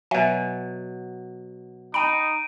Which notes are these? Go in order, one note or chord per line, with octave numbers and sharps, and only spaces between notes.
B2 F#3 E5 G#5
D#4 G5 A#5 B5 D7 D#7